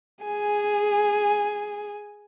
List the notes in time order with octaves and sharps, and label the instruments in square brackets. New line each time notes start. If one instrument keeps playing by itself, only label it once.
[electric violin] G#4 G#5